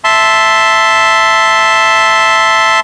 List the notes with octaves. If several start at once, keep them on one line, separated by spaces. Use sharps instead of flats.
E5 A5 C6